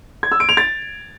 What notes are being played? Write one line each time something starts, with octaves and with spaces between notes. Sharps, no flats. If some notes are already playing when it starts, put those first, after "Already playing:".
G#6
E6
D7
F7
A6